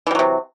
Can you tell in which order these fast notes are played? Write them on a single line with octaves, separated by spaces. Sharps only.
E3 G3 F#3 C3